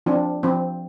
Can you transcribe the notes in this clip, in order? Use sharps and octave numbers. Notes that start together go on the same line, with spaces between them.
F3 C4 D4 F4
F3 C4